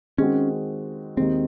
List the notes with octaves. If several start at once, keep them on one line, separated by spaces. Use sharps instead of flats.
D#3 G#3 C4 C#4 F#4
D#2 D#3 G#3 C4